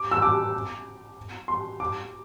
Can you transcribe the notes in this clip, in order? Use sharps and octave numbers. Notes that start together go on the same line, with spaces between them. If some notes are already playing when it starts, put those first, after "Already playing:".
Already playing: D6
E6
D6
C6
D6